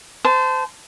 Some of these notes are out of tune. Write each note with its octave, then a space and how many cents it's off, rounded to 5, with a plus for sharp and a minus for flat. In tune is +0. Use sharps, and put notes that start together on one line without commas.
C5 -25 A5 +0